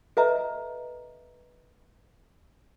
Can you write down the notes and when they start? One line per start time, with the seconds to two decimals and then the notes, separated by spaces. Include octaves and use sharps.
0.17 A4 B4 D#5 E5 A#5